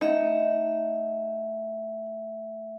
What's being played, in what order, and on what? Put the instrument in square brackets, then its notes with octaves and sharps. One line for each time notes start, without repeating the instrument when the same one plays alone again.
[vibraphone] A3 E5 F#5 [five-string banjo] D#4